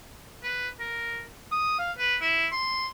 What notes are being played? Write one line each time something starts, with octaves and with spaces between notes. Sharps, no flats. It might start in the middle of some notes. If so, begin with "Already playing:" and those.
B4
A#4
D#6
F5
B4
E4
C6